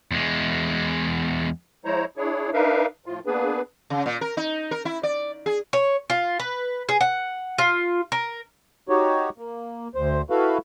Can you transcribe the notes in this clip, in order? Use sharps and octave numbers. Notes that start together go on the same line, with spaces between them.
E2 G#3
F3 G#3 E4 C5 C#5 A#5
D4 E4 G#4 C#5
D4 D#4 A#4 B4 E5 F5
A2 F3 F4
A#3 B3 D4 G#4 B4
C#3
A#2
A#4
D#4
A#4
E4
D5
G#4
C#5
F4
B4
G#4
F#5
F4
A#4
D#4 F#4 G4 C#5
A#3
D2 C5
E4 F#4 A4 B4 F5